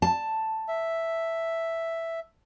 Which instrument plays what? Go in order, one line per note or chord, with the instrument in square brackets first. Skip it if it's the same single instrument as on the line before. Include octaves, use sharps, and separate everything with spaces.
[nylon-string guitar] A5
[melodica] E5